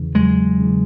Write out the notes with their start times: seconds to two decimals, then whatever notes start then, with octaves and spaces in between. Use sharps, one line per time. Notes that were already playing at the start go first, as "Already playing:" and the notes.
Already playing: E2 C#3 E3
0.15 E2 F#3 G#3
0.59 C#3 E3